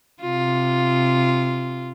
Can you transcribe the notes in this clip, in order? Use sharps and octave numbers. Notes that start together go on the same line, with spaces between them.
C3 F4